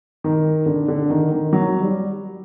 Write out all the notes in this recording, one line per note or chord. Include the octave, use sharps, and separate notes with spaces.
D#3
D3
D3
D#3
D#3
F#3
G3